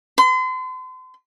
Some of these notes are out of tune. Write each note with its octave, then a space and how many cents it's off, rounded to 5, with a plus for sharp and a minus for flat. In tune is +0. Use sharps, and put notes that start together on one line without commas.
C6 -40